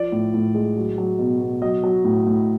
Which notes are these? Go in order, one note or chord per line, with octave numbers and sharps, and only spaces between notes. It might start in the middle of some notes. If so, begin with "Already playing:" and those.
Already playing: F3 D5
A2
A2
G#3
F#3
F#3
B2
B2
F#3 D#5
F#3
A2
A2